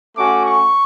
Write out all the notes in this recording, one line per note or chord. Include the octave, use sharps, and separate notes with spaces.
A3 C#4 F#4 D6
C#6